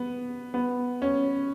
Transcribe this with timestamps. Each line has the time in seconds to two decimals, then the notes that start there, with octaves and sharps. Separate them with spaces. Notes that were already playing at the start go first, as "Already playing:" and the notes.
Already playing: B3
0.54 B3
1.02 C#4